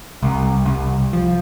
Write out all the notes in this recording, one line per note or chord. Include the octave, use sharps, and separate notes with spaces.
C2
C2
F3